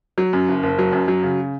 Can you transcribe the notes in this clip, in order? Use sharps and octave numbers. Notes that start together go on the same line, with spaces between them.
F#3
F#2
F#1
F#1
F#3
F#2
F#3
C#3